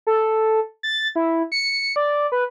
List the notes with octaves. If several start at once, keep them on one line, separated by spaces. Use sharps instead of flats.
A4
A6
E4
C#7
D5
B4